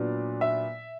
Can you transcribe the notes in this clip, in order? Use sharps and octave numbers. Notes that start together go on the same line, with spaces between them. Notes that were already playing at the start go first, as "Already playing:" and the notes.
Already playing: A#2 F#3 B3 D4
E5